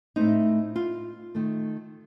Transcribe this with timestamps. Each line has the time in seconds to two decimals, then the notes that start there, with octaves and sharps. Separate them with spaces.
0.16 A2 A3 C4 D#4
0.76 F4
1.35 D#3 A3